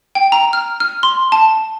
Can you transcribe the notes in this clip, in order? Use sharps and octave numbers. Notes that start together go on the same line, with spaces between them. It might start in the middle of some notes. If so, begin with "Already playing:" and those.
G5
A#5
F6
F6
C6
A5